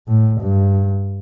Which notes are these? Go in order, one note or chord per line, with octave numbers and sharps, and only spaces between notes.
A2
G2